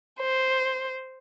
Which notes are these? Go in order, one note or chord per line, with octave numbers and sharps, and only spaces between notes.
C5